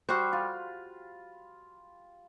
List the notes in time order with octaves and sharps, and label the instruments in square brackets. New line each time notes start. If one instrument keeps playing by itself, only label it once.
[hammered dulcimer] G3 [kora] F#4 C5
[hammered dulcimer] F4